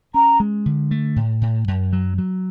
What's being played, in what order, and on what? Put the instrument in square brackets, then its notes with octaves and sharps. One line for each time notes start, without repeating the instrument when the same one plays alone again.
[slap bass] C#4 [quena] A#5
[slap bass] G#3
D3
A3
A2
A2
F#2
F#3
F#3